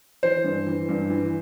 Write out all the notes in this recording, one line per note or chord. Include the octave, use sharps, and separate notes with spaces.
E3 C5
G2
E3
G2
E3